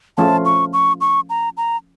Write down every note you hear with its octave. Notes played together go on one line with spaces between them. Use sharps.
F3 A3 C#4 F4 A5
C#6
C#6
C#6
A#5
A#5